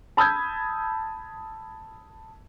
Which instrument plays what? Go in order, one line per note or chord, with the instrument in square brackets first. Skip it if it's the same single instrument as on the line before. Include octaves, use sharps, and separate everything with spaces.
[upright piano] A5 B5 D#6 E6 G6 G#6